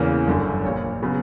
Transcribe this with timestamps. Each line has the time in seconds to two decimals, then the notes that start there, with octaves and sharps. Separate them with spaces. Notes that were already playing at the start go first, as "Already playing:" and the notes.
Already playing: E2 C#3 E3 A#3
0.27 G1 F#2 D3 F#3
0.64 A#1 A#2 A#3 C#5
1.02 C#3 F#3 B3